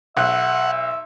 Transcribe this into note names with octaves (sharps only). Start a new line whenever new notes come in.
B1 E5 F#5 F#6